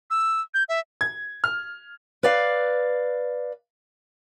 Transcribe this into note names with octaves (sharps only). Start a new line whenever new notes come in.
E6
G6
E5
G#6
F6
B4 D5 F5